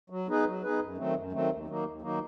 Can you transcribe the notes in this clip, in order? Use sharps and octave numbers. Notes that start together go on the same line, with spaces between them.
F#3
B3 D#4 G#4 B4
F#3
B3 D#4 G#4 B4
F#2
D#3 F#3 A3 C4
F#2
D#3 F#3 A3 C4
D#2
D#3 F#3 A#3 D#4
D#2
D#3 F#3 A#3 D#4